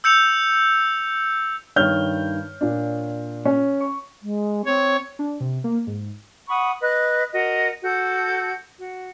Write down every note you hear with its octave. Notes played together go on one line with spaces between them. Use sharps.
E6 G6 C#7 F7
G2 D#3 C#5 F6 G6
A#2 D4
C#4
C#6
G#3
C4 C#5
D4
C3
A#3
G#2
F#5 B5 C#6 D#6
B4 D#5 F#6
F#4 A#4 D#5
F#4 A4 G6
F#4